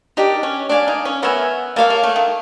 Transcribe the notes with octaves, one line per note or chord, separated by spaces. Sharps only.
D4 D#4 G4 A#4
C#4
D4 D5 F5 G#5
D#4
C#4
B3 A#4 C#5 E5 G#5
A#3 C#5 F5 A5
A#3
A3
D#3